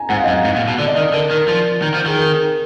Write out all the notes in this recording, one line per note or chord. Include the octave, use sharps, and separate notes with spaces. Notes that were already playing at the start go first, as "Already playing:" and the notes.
Already playing: G#5 A#5
G#2 F#5
F5
D#5
F#2
F5
G#2
A#2
B2
D3 D5
D#5
D#3 D5
D3 A#4
D#3 A#4
F3 D5
D#3
F3
D#3 G#4
A#4